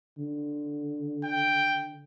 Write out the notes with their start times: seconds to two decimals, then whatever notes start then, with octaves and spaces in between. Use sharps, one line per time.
0.18 D3
1.24 G5